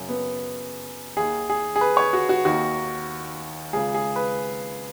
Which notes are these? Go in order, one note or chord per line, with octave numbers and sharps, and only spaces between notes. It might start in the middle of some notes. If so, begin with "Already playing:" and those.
Already playing: F#2 C#3
B3
D#2 D#3 G#4
G#4
G#4
B4
C#5
F#4
F#4
D#2 D#3 F#4
C#2 C#3 G#4
G#4
B4